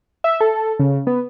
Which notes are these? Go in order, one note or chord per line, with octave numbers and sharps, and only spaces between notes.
E5
A4
C#3
B3